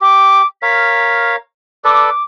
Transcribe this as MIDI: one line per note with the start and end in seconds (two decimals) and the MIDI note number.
0.01 0.42 67
0.01 0.46 86
0.62 1.36 70
0.62 1.36 73
0.62 1.36 77
0.62 1.36 95
1.84 2.10 69
1.84 2.10 71
1.84 2.10 74
1.84 2.24 86